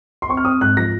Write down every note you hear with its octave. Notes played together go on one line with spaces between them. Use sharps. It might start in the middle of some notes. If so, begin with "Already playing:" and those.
C6
C4 C#6
F6
C4 D#6
G#2 F#6
F3 A#6